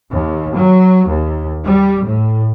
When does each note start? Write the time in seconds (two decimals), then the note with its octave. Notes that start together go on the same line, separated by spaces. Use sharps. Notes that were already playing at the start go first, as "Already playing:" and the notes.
0.11 D#2
0.56 F#3
1.09 D#2
1.65 G3
2.05 A2